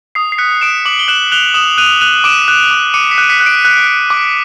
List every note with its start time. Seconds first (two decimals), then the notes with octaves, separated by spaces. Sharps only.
0.15 D#6 C7
0.32 C7
0.38 F#6 B6 C#7
0.61 D#6 D7 E7
0.85 D6 E7 F#7
0.99 G7
1.08 F#6 E7 F#7
1.32 F#6 F7 G7
1.54 D#6 E7 F#7
1.78 F#6 D#7 F7
2.01 F#6 D#7 F7
2.24 D6 D7 E7
2.48 F#6
2.71 D6
2.94 D6 C#7 D#7
3.11 B6 C#7
3.18 F#6 D7
3.29 B6 C#7
3.40 F#6
3.46 C7 D7
3.65 F#6
3.87 F#6
4.10 D6